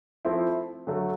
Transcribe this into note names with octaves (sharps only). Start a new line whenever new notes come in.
F3 A3 C4 E4
D3 F#3 A3